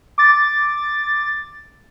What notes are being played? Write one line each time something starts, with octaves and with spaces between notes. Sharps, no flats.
D6 A6